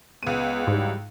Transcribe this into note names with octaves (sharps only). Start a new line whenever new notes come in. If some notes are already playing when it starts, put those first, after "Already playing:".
C#2 G#3 B3 D#7
G#2 E3 F#3 G3